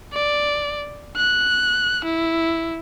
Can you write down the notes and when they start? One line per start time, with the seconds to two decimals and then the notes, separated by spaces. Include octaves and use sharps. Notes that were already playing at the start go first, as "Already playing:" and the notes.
0.13 D5
1.17 F#6
2.04 E4